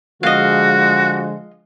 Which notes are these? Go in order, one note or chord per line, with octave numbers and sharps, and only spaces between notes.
D3 F3 G#3 F#4 D#5 F5